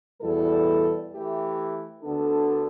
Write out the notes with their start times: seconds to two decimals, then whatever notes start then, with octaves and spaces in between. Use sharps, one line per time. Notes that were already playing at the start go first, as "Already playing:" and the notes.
0.21 E2 B2 G3 E4 A4
1.12 E3 A3 G4
2.03 D2 D3 B3 D4 A4